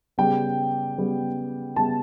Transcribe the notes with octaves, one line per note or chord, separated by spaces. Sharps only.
C#3 G3 B3 G5
C#3 G3 B3
C#3 G3 B3 A5